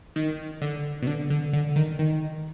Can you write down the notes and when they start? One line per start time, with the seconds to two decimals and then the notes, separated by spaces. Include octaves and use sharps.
0.16 D#3
0.61 D3
1.02 B2
1.07 D3
1.30 D3
1.53 D3
1.76 D#3
1.99 D#3